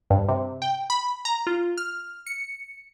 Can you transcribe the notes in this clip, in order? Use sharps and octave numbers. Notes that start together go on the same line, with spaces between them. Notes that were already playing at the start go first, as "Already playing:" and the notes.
G2
C3
G5
B5
A#5
F4
F6
C#7